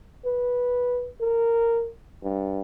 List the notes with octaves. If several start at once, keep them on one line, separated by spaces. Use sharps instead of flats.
B4
A#4
G2